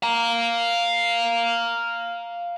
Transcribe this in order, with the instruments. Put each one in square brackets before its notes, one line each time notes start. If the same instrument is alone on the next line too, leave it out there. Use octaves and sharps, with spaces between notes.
[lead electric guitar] F5 A#5